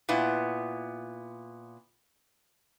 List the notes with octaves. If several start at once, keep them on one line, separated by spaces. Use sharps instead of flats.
A#2 B3 E4